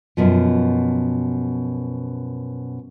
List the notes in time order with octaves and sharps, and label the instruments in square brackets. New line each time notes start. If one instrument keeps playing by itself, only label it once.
[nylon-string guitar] F#2 B2 F3